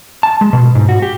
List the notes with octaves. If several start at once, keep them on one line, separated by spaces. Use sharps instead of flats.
A5
G#3
B2
G#2
F#4
G4